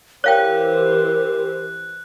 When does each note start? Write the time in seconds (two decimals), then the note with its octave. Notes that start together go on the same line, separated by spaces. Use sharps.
0.24 E3 G4 A#4 C5 C#5 F5 G5 F#6